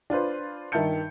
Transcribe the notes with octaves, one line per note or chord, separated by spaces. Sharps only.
D4 F4 B4 C5
G2 D#3 E5 A5 G6 C#7